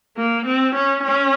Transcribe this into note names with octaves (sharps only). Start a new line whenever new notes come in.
A#3
C4
C#4
C#4